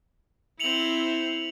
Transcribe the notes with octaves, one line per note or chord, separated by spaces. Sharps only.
C4 E4 C#7 F7 F#7